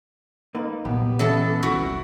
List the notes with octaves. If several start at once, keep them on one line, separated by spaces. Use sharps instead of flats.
A#3 D#4 B4
C2 A#2 F#3 B3 G4
E3 C#4 A4 D5 A5
F1 C2 E4 F#4